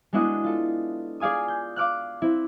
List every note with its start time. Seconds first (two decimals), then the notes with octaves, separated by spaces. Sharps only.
0.13 G#3 B3 D4 E4 F#4 D#5
0.44 F4 A4
1.20 G#4 D5 F5 G#5 D#6
1.48 G6
1.76 F5 D6 F6 F#6
2.22 C4 E4